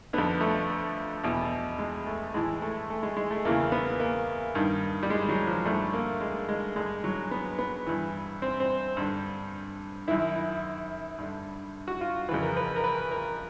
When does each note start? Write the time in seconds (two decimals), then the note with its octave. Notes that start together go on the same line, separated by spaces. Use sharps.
0.13 F2 D3 B3
0.41 A3
1.24 E2 B2
1.79 G#3
2.07 A3
2.34 A2 E3 G#3
2.62 A3
2.90 A3
3.03 G#3
3.17 G#3
3.31 A3
3.45 E2 C#3 E3 A#3
3.72 B3
4.00 A#3
4.55 G2 D#3
5.03 G3
5.10 G#3
5.29 F#3
5.47 F3
5.65 G2 D3 A3
5.93 A#3
6.21 G#3
6.49 G#3
6.76 G2 D3 G#3
7.04 F#3
7.31 B3
7.59 B3
7.87 G2 E3
8.42 C4
8.60 C4
8.97 G2 D3
10.08 F#2 D#3 E4
10.35 E4
11.18 G2 D3
11.88 F#4
12.01 F4
12.29 F2 C#3 E3 B4
12.43 A#4
12.57 B4
12.76 A#4
12.84 B4
13.12 A#4